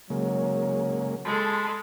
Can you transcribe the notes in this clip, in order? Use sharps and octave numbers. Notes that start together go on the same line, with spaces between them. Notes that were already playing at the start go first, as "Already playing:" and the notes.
C#3 F#3 G#3 A#3
G#3 A4 A5 B5 C6